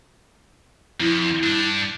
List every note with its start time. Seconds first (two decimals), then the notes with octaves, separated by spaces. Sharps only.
1.00 F2 E4
1.43 G2 D4